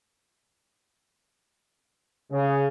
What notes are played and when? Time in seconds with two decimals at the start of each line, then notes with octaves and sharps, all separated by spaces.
2.31 C#3